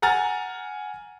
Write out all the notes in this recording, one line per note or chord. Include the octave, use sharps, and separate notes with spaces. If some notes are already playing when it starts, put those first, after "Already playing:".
F#5 G#5 A#5 F6 A6